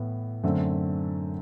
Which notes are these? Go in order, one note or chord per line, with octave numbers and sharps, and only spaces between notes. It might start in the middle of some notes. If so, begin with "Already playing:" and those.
Already playing: A2 E3 B3
F#2 D3 A3 C4